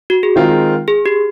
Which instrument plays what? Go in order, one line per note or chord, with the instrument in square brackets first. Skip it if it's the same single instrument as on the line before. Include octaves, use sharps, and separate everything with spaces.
[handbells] F#4
G#4
[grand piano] D#3 G#3 C4 F4 A#4
[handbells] G#4
G4